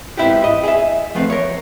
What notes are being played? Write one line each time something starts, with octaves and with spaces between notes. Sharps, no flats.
G#2 B3 C4 E4 F#4 G4
D#5
G#4 D#5 E5
F3 A3 B3 C4
A#4 C#5